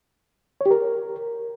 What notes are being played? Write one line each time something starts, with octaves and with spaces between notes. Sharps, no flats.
C#5
G4
A#4